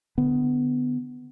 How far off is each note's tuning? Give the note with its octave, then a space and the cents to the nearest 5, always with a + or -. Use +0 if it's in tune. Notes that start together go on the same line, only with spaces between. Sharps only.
D3 +0 B3 +15